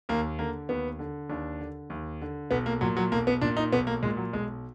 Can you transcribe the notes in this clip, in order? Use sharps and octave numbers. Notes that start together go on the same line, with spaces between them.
D#2 A#3
D3 A#3
D#2 B3
D3
D#2 D4
D3
D#2
D3
B1 B3
A#3
A#2 F#3
F#3
B1 A#3
B3
A#2 D4
D#4
B1 B3
A#3
A#2 G#3
F#3
B1 G#3